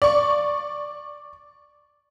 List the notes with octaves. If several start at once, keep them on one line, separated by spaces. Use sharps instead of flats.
D5 C#6